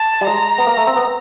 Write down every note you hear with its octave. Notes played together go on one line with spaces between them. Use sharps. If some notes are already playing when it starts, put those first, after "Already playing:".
Already playing: A5
G3
G#3 A#5
B3
A#3
A3
C4
B3